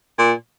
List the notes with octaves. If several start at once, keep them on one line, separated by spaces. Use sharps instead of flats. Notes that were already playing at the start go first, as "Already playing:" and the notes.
A#2